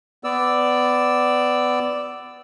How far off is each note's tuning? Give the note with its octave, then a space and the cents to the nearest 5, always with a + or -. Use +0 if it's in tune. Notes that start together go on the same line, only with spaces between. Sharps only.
B3 +20 D5 +0 E6 +0